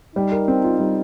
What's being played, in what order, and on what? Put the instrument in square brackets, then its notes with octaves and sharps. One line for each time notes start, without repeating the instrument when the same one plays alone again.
[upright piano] G3 [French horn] D#4
[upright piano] A#4
C4
F4
G3